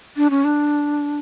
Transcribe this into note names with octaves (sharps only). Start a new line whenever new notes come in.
D4
C#4
D4